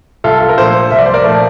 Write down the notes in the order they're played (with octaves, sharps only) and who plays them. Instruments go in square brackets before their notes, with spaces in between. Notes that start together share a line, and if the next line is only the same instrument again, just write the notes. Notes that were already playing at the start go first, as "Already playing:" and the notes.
[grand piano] C2 F4 A4
A4
A#4
A#2 F3 A3 A4 C5
C2 E5
D5
C5
A#4 D5
A#2 F3 A3